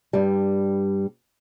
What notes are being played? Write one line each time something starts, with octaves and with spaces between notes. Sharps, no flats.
G2 G3